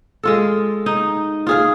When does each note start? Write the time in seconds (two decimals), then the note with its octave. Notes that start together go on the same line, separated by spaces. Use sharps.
0.23 G#3 F4 A4
0.86 D#4
1.47 F4 G#4 F5